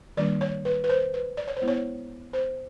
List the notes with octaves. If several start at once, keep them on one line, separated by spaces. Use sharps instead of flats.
D#3 G3 A#3 D4 D5
C#5
B4
B4
C5
B4
D5
C#5
C5
G#3 B3 E4
C#5
C5